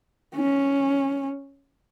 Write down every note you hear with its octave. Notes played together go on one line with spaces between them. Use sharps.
C#4